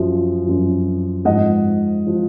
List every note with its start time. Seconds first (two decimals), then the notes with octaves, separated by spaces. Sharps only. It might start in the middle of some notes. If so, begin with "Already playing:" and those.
Already playing: F#2 F3
0.45 F#2 F3
1.25 G#2 F3 D#5 F#5
2.07 F3